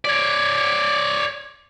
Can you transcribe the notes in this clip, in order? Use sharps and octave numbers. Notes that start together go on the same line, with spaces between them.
C#5 D5